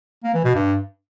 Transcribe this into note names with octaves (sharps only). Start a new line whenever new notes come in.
A#3
E3
B2
G2